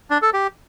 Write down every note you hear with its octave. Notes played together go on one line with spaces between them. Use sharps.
D4
A4
G4